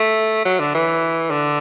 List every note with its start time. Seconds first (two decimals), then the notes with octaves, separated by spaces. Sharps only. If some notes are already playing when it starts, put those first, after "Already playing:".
Already playing: A3
0.45 F#3
0.60 D3
0.74 E3
1.30 D3